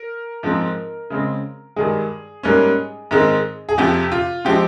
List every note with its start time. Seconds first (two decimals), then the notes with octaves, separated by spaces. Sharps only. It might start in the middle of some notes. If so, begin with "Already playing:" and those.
Already playing: A#4
0.43 G#2 F3 G#3 C4
1.10 C#3 G#3 C4
1.76 G2 D#3 G#3 G#4
2.43 G#2 G3 A#3 C#4
3.11 G#2 D#3 G#3 C4
3.69 G#4
3.78 F2 C3 F3 G4
4.12 F4
4.45 C3 F3 G#3 C4 G4